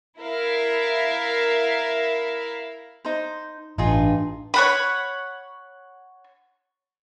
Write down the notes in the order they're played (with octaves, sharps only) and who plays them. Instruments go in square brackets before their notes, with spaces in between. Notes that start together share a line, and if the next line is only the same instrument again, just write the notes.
[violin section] E4 A#4 E5 F5
[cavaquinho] D#4 C5
[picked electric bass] A1 [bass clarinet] G2 [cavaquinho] D#4 F4 G#4
[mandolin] C#5 F#5 B5